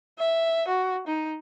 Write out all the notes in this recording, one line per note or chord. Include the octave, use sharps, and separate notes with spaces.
E5
F#4
D#4